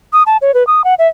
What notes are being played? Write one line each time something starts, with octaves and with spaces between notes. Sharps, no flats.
D#6
A5
C#5
B4
D#6
F#5
E5